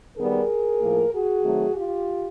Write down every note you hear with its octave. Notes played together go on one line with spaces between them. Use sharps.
D#3 G3 B3 G#4 A#4
A2 F3 A#3
F#4 G#4
D#3 F#3 A3 C4
F4 G4